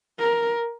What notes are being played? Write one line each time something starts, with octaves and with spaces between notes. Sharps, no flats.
A#4